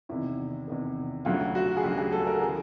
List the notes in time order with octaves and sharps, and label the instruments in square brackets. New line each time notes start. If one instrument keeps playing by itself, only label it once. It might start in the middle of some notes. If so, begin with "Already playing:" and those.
[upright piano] E2 C3 D#3 E4
E2 C3 D#3
D2 C#3 F#3 F4
F#4
G#4
D2 C#3 F#3 G4
G#4
A4
A#4
C#3 E3 G#4